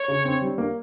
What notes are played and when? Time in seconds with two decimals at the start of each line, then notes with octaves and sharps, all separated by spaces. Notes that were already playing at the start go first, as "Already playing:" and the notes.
Already playing: C#5
0.08 C#3
0.25 C4
0.41 G3
0.58 A#3